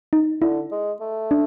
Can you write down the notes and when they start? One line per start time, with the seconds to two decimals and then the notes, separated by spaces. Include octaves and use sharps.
0.13 D#4
0.41 D3 E4
0.71 G#3
1.01 A3
1.31 D4